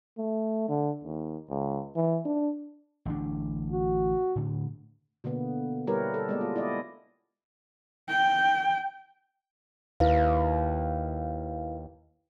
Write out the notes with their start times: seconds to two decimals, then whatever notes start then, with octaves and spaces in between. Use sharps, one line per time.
0.18 A3
0.69 D3
1.04 D#2
1.49 C#2
1.96 E3
2.25 D4
3.05 A1 D3 D4
3.71 F#4
4.36 A2 D3
5.24 B2 D3 A#3 B3
5.87 G3 E4 G4 A#4 B4 C#5
6.14 A4
6.29 G#3 A#3 B3 D5 D#5
6.41 F4
6.56 E4 D5 D#5
8.09 G5
10.00 D#2 E4 B4 F5